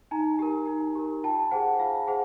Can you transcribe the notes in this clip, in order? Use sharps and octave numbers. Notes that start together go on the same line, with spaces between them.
D#4 G#5 A#5
G4 A#4
D#4
G4 A#4
F4 G5 A5
G#4 C5 F#5 G#5
F4 F5
G#4 C5 F#5